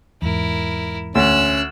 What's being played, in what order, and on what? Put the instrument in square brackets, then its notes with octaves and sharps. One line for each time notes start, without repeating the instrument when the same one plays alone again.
[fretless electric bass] E2 G#2 [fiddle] E4 A#4
[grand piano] D2 [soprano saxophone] C#4 [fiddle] E6 F#6